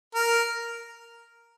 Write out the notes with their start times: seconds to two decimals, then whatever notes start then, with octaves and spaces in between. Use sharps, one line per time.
0.15 A#4